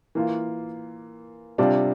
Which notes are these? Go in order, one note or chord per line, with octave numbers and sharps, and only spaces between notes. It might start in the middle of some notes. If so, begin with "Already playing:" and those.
E3 A#3 F4
C3 G3 D4 F4